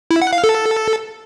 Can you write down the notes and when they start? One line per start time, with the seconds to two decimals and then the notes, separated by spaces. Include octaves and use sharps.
0.11 E4
0.22 F#5
0.33 F5
0.44 A4